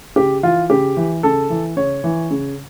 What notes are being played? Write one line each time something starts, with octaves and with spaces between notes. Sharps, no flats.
C#3 G4
E3 F4
C#3 G4
E3
C#3 A4
E3
C#3 C#5
E3
C#3